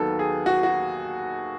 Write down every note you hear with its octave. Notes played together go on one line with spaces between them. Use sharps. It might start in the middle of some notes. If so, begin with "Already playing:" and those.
Already playing: D#2 D#3 F#3 B3 A4
G#4
F#4
F#4